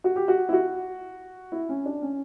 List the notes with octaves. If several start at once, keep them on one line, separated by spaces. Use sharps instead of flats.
F#4
G4
F#4
E4
F#4
E4
C#4
D4
C#4